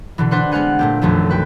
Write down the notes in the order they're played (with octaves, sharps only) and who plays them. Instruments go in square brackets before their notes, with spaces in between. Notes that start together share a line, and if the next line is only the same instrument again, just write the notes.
[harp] B2 D3 E3
D4 B4 C5 F#5 C6
G#3 B3 C4 F5 F#5 G#5
A#2 A3 G4
B1 F#2 D#3 F3 A3
F#4 B4 G5